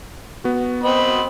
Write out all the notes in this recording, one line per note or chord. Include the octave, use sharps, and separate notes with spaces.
B3 F#4
C4 D#5 B5